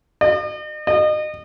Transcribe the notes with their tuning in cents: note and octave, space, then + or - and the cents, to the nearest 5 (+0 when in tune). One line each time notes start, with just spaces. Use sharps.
D#5 -40
D#5 -30